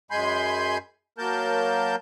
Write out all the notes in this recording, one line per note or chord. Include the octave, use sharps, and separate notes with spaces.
F#2 G#3 G#5 B5 C6 G6
F#3 A#3 A#4 A5 G6